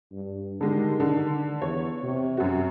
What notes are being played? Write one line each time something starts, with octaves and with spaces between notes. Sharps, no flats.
G2
D3 D#3 G#3 G4
D3
E2 C#5
C3
F#2 F#4